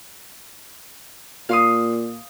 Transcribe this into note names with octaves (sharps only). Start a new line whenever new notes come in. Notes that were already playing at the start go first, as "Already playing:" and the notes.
A#2 F5 C6 D#6